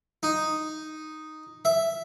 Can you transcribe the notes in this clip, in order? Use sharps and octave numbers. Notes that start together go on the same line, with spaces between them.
D#4
E5